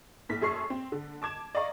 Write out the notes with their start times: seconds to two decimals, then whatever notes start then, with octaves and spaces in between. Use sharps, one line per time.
0.29 A#1 A2 B6
0.42 F#2 G#4 A4 C6 C#6 C7
0.70 C4
0.92 D3
1.22 A5 D6 G#6 E7
1.55 D5 D#5 F5 A#5 C#6